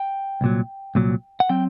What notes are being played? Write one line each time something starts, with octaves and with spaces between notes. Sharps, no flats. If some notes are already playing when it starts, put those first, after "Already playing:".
Already playing: G5
C2 A#2 F#3
C2 A#2 F#3
F#5
F#3 C4 G5